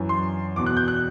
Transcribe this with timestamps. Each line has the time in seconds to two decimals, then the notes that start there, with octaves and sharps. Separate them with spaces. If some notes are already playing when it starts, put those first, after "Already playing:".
Already playing: F#2 E3
0.09 C6
0.56 E2 B2 D6
0.66 F#6
0.77 G6
0.88 F#6